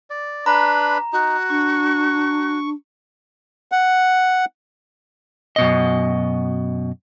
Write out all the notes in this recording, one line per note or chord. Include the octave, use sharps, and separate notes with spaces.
D5
D4 B4 A#5 B5
D#4 F#4
D4 C#6
F#5
F#2 B2 D#5